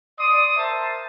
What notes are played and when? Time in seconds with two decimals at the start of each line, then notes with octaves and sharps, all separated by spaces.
0.19 D5 C6 D#6
0.56 A#4 C5 E5 A5